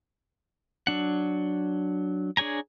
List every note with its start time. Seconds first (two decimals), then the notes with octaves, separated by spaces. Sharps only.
0.87 F#3 D4 F#5
2.37 D4 G#4 C#5 G#5 A#5